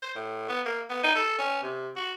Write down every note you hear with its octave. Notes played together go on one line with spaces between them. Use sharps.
C5
A2
B3
A#3
B3
D#4
A4
C#4
C3
F#4